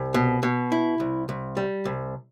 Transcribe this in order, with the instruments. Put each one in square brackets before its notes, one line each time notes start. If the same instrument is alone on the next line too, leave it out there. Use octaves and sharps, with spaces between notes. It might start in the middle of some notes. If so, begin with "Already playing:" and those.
Already playing: [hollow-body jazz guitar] C2
B2
B2
E4
C2
C2
G3
C2